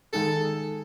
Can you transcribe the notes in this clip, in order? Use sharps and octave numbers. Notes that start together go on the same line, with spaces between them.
D#3 G#3 D#4 G#4 A4